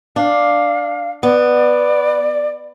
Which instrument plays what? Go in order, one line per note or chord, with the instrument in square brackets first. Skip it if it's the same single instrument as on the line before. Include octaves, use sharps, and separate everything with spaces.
[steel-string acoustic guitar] D4 [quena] F5
[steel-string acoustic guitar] B3 [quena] D5